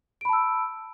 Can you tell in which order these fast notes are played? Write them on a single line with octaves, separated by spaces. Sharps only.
D7 B5 A5 E6